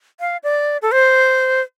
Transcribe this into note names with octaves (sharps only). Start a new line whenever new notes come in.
F5
D5
A4
C5